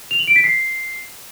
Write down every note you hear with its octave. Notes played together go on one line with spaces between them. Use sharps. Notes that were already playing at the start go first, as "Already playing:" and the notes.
F7
F#7
D7
B6
C7